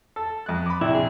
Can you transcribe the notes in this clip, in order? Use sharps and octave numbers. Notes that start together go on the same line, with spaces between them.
A4
F2 F#6
B5 D6
A#1 C3 E4
G#4